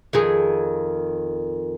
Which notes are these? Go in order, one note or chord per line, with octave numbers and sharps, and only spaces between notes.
F2 D#3 G#4